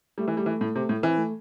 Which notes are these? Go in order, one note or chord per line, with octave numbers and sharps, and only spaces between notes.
G3 A3
E3
G3
E3
A2
C3
A2
E3 C4
A3